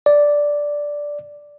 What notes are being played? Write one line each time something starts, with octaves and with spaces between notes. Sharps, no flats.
D5